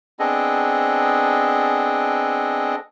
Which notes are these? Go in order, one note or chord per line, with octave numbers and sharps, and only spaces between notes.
B3 C4 D4 G#4 A4 D#5